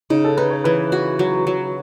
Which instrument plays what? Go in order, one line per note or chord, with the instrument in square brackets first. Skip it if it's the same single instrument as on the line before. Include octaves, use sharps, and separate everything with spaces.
[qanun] C#3 [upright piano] D#4
[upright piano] A4
[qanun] D#4 [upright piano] B4
[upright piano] C#5
[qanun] E3 [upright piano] B4
[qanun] F#4
F#3
F#3